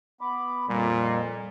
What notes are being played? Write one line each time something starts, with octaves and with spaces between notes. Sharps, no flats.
B3 B5 D6
F2 A#2 G3